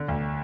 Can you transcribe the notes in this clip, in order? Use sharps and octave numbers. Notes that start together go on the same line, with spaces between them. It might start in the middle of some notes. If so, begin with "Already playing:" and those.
Already playing: D3
D2